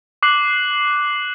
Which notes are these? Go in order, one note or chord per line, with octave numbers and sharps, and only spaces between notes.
D6 F#6 C7 F#7